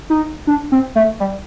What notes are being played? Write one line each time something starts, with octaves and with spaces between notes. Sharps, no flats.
D#4
D4
C4
A3
G3